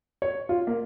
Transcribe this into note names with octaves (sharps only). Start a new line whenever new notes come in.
C#5
F4
A#3